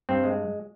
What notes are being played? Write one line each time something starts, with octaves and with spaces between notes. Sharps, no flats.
G2 C4
G#3